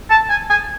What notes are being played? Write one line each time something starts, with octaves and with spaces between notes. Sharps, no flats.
A5
G#5
G#5